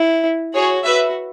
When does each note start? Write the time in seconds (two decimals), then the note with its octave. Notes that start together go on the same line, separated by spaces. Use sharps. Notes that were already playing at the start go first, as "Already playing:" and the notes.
Already playing: E4
0.55 F#4 G#4 C#5
0.85 F#4 B4 E5